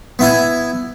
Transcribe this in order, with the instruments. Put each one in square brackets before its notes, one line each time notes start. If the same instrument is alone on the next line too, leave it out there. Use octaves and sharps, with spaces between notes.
[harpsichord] B3 E4 G#5